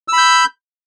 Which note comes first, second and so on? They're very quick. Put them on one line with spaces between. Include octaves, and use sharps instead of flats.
E6 B5 G6